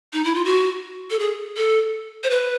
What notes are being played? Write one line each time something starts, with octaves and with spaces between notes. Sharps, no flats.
D#4
E4
F4
F#4
A4
G#4
A4
C5
B4